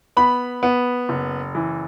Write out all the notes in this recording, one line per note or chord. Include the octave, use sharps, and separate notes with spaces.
B3 B5
B3
F#1
E3